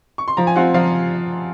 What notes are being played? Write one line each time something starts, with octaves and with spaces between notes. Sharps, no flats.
C#6
C6
F3 A#5
G#5
C4 F4 F#5
F3 F5